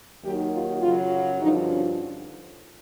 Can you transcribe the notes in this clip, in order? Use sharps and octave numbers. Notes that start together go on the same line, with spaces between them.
D#2 D#3 F#3 G4
F4
F#2 C#3 F#3 F4
F4
G2 D3 F3 D#4
C#4